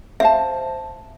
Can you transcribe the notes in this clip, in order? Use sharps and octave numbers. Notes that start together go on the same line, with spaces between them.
C5 E5 F5 A5